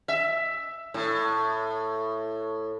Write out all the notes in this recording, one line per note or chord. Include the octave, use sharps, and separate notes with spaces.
E5
A2